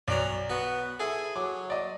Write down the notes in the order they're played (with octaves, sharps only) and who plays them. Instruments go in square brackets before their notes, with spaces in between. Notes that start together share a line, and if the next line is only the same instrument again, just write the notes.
[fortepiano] B1 F#3 [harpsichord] C#5 D5 A#5
[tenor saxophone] B3 [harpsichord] F#4
[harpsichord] E4 A4 [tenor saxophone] G#4
[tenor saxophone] F#3 [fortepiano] D6
[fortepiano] D5 D#5